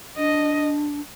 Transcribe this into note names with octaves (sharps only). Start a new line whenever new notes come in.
D4 D#5